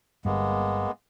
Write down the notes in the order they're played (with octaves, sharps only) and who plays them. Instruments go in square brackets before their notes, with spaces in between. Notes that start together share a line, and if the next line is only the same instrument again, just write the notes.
[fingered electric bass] G1 G2 [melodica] G#3 A#3 B3